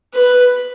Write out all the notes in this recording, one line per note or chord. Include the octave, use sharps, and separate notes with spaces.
B4